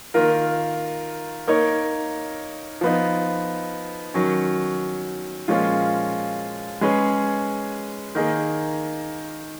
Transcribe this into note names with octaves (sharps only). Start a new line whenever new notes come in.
D#3 A#3 F4 A#4
A#3 D#4 A#4 C#5
F3 B3 D#4
D#3 F#3 C#4
A#2 F3 G#3 C#4 F4
G#3 C#4 G#4 B4
D#3 A#3 D#4 G#4